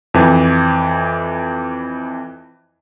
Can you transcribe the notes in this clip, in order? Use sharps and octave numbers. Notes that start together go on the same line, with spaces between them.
F2 E3